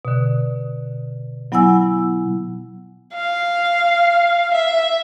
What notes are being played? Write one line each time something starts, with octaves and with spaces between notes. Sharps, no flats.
B2 D3
F#3 B3 E4 F#5 G#5 E6
F5
E5